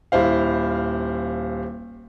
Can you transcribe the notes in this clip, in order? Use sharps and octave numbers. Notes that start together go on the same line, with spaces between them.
D#1 E4 C5 F5